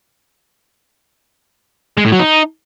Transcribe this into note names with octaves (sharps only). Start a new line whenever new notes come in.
G#3
A2
F#3
D#4